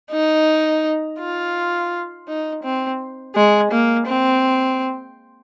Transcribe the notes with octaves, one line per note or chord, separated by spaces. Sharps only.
D#4
F4
D#4
C4
G#3
A#3
C4